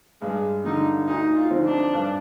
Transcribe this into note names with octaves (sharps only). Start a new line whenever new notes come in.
G2 G#3
D3 G3 D#4
D2 D#4
F4
D3 F3 C4 D#4
D4
G2